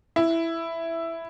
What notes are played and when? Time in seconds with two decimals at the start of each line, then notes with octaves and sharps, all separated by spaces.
0.16 E4